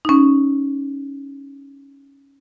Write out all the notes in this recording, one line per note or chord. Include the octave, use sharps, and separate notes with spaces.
C#4 D#4